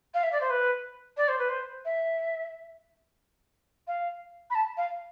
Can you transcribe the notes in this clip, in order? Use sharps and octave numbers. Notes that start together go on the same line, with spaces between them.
F5
E5
D5
C5
B4
D5
C5
B4
C5
E5
F5
B5
A5
F5